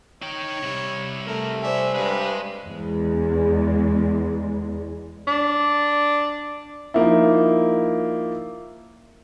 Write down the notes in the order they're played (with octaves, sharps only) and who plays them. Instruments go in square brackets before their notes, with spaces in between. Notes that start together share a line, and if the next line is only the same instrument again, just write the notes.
[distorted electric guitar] D#4 G5 [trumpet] C#5
[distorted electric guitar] C3 G3
[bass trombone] A3 [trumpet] A#4
[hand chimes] C5 D5 G#5 [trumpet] E5
[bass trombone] G2 [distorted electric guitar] G#3 G#4 [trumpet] B4
[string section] E2 G#3
[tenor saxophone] D4
[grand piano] F3 A#3 D#4 E4